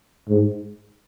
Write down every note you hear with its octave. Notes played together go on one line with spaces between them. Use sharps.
G#2